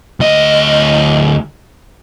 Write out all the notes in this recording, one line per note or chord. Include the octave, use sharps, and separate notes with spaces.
D2 D#5